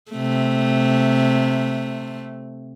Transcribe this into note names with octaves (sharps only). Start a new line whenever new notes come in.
C3 A3